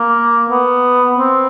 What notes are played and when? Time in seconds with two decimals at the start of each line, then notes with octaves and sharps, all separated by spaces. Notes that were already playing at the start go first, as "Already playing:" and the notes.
Already playing: A#3
0.50 B3
1.18 C4